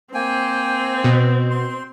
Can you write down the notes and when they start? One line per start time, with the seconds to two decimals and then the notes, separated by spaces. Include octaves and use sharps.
0.14 A#3 C4 G5 G#5
1.04 B2
1.51 C6